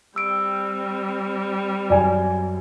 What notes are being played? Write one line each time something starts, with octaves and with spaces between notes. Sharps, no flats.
G3 C4 E6 D7
F#2 D5 G#5